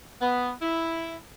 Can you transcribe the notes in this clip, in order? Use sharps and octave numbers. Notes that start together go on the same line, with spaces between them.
B3
E4